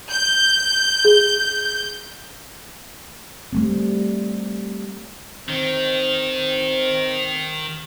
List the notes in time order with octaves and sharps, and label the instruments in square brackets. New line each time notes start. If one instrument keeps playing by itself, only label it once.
[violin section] G6
[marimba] G#4
[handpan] G3 A3 C4
[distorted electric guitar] D#3 [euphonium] C4